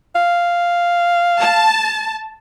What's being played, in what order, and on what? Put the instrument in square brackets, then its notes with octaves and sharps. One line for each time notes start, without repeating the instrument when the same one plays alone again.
[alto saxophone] F5
[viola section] A5